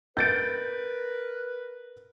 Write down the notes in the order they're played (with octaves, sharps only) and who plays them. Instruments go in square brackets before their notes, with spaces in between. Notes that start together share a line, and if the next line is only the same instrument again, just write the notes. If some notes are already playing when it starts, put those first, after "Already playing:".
[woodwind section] A#4 B4 [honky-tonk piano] G6 A6 D7